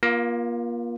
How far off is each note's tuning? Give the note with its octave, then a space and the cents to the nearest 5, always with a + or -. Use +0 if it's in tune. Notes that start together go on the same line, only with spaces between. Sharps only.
A#3 +35 F4 +0